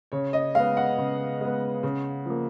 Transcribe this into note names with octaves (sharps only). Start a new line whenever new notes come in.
C#3 C#5
D#5
G#3 B3 F5
F#5
C#3
G#3 B3
C#3
F3 A#3